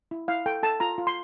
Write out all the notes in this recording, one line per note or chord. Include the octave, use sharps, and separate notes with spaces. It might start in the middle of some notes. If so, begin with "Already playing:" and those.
E4
E4 F5
A4 G5
A4 A5
F4 A#5
F4
C6